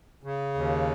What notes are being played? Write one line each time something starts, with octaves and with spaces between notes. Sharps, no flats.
C#3
D#2